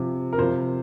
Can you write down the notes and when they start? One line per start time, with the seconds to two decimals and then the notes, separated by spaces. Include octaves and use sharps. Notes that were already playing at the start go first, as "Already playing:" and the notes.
Already playing: C3 F3
0.33 A#4
0.38 C3 F3 C5